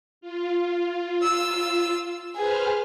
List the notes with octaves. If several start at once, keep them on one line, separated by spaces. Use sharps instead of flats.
F4
E6
G#4 B4 C5 F6